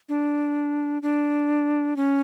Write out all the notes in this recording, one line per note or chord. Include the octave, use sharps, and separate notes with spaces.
D4
D4
C#4